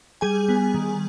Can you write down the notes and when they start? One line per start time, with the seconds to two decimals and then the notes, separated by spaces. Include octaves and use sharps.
0.21 G3 G#4 G#5
0.49 B3
0.74 D#3